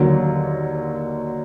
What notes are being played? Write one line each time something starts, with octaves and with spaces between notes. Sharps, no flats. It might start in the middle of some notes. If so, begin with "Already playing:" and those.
Already playing: D#2 D3 F#3